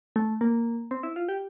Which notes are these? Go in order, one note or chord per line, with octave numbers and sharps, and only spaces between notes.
A3
A#3
C4
E4
F4
G4